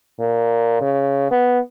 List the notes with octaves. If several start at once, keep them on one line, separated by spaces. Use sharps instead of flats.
A#2
C#3
B3